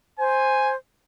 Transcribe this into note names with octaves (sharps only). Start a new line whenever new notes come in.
C5 G#5